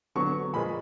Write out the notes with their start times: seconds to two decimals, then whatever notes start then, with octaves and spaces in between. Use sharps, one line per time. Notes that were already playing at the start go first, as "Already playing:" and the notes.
0.15 D3 F#3 B3 C#6
0.53 A#2 F3 G#3 B5